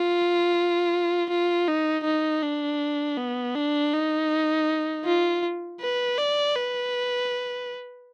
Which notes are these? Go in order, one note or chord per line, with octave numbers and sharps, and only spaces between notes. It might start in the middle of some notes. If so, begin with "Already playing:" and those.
Already playing: F4
F4
D#4
D#4
D4
B3
D4
D#4
F4
B4
D5
B4